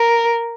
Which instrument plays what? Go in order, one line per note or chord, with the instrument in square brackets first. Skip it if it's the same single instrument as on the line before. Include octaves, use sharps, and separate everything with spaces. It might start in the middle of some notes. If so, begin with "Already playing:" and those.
Already playing: [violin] A#4